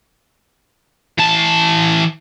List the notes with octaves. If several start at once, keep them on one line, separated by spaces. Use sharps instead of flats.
E3 A5